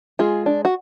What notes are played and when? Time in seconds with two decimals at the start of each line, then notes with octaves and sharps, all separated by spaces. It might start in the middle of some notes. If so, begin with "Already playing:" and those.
0.19 G#3 F4 G#4
0.46 D4
0.65 F#4